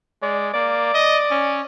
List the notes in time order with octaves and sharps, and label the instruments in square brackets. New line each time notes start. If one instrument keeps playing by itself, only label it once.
[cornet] G#3 [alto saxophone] D5
[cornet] A#3 [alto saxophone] D5
[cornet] D#5
C#4